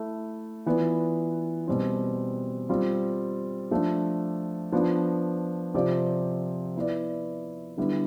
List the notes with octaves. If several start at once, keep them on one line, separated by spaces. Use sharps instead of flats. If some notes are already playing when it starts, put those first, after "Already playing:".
Already playing: A3 E4 A4
E3 B3 F4 B4 D5
B2 G3 C4
G3 C4 F4
F3 A3 D4 A4
F3 B3 D4
C3 F3 C4 G4 D5
B3 E4 B4 D5
D3 G3 B3 E4